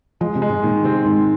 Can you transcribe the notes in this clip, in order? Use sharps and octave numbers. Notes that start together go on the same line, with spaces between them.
F3 G#3
C3
G#3
G#2
A#2 D#3
C3 C4
G#2 D#3